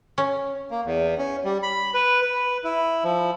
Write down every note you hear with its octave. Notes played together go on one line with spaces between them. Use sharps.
C#4
A#3
E2
C#4
G3
B5
B4
B4
E4
F3